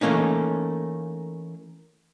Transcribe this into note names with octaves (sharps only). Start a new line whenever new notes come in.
E3 A3 A#3 C#4 D#4